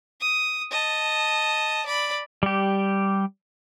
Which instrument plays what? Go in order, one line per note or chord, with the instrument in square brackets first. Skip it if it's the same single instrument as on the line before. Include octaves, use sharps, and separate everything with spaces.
[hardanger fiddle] D#6
D#5 A5
D5 B5
[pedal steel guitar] G3 G4